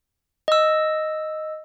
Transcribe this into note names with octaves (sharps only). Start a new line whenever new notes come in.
D#5 E6